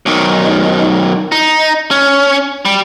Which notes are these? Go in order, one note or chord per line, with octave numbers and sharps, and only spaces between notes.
B1 D#3
D#4
C#4
G3